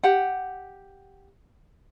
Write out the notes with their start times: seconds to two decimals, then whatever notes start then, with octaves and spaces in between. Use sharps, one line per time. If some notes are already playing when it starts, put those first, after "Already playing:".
0.04 G4 F#5